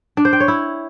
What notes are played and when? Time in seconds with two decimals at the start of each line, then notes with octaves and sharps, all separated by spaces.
0.17 D4
0.25 C5
0.33 G5
0.40 C#5
0.48 E4